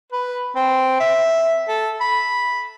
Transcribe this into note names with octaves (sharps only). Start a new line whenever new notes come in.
B4
C4
E5
A4
B5